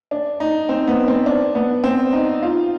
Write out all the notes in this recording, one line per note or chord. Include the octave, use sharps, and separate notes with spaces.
D4
D#4
C4
B3
C4
D4
B3
C4
D#4
F4